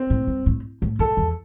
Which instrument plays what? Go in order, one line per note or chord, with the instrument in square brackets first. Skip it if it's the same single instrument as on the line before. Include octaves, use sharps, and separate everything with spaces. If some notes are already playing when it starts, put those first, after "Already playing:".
Already playing: [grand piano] C4
[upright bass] A2
G2
A2
A2
[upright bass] F#2 [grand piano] A4
[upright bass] E2